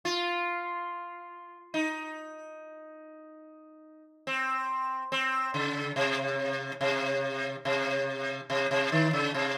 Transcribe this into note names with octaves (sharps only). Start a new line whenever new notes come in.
F4
D#4
C4
C4
C#3
C3
C3
C3
C3
C3
D#3
C#3
C3